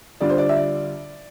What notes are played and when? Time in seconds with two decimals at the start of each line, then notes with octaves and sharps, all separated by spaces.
0.20 D3 G3 D4 F4 D5
0.30 C5
0.38 D5
0.49 E5
0.56 D5